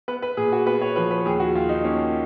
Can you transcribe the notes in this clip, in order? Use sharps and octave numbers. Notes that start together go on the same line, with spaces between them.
B3 B4
B4
A#2 G#4
F#4
B3 B4
C#5
F3 B4
B4
D#2 G#4
F#4
D#2 F4
D#4
A#3 C#4